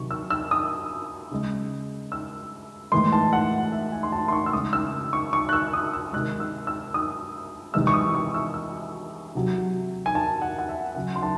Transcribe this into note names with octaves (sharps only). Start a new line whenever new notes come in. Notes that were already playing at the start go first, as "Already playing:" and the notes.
Already playing: C3 D#3 F#3 C#6
E6
E6
D#6
C#3 G#3
E6
A2 E3 G#3 C6
A5
F#5
E5
G#5
C6
A5
C6
C#6
E6
C#3 G#3 D#6
E6
C#6
C#6
F#6
E6
D#6
E6
C3 D#3 G#3 F#6
E6
E6
D#6
C3 E3 G#3 E6
C#6
D#6
C#6
E6
E6
C3 F#3
G#5
A5
F#5
F#5
E5
C#3 F#3 F#5
C6
A5